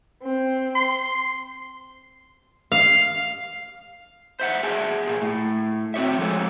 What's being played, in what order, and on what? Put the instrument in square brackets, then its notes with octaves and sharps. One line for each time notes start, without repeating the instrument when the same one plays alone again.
[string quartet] C4
[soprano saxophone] C6
[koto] F5
[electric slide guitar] C5 E5 F#5
G#4 E5 G#5 A5
A#2 G#4
A2
C4 F#4 C#5 E5
F3 G#3 A4 C#5